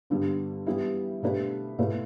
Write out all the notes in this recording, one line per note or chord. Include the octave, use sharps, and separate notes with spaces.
G2 D3 G3 B3 D4
E3 G3 B3 E4 G4
B2 A3 D4 G4 B4
B2 A3 E4 B4